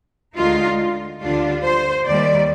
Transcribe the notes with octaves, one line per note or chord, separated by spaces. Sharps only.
D2 D3 G#3 D#4 F4
D2 D3 G3 D4 F4
C5
D#2 D#3 G3 D5